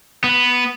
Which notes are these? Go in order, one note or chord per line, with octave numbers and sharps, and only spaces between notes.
B3